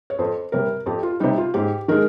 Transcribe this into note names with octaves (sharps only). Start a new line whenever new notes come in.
C#5
F2 C5
C3 G3 A#4
F2 G4
F4
C3 G3 D#4
F4
G#2 G4
D#3 G#3 A#4